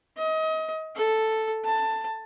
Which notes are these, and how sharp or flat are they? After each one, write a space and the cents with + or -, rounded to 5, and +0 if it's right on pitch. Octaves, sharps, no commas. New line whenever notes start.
D#5 +30
A4 +0
A5 +15